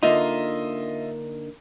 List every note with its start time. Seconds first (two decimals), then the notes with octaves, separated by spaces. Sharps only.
0.03 D3 A#3 D#4 F4 D#5 E5